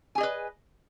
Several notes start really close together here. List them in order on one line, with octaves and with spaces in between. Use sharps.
G#5 G#4 D#5 B4